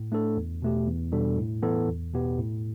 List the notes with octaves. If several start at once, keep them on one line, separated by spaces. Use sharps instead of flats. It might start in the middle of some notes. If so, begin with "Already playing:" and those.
Already playing: A2
A3 D4 A4
E2
B2 A3 G4
E2
B2 G3 D4 A4
A2
E3 B3 E4 A4
E2
B2 B3 G4
A2